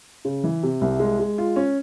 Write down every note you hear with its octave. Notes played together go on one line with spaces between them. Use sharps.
C#3
E3
C3
C2
G#3
G#3
F4
C#4